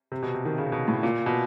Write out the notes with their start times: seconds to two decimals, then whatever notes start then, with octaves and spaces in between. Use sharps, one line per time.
0.12 C3
0.22 B2
0.34 C3
0.45 D#3
0.58 C#3
0.72 B2
0.88 A2
1.03 A#2
1.26 B2